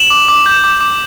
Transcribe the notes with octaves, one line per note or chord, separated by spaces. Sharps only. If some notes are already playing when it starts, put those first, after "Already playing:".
Already playing: E7 F#7
D6
D6
G6
D6
D6